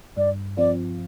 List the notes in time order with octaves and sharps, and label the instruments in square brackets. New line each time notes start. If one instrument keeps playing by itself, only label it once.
[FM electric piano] G2 [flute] D5
[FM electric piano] F3 C4 F4 [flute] D5